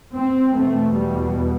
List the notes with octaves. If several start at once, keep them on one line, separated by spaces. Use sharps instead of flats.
C4
E2 B2 A3
G3